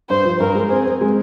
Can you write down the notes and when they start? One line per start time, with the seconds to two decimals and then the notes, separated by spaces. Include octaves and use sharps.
0.09 G2 C5
0.25 F3
0.40 G2 A#4
0.55 G#3
0.70 C4 G#4
0.85 C4
1.01 G#3